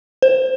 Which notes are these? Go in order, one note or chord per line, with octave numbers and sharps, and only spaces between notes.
C5